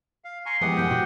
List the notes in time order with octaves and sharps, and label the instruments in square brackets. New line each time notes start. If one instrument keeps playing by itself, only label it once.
[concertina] F5
[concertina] G#5 A#5 C#6 [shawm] C6
[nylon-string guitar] E3 G#3 B3 [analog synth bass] F3 [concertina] G4 F#5 D#6
[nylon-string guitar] F#2 A2 C3 [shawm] G5
[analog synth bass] B2 [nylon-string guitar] F#4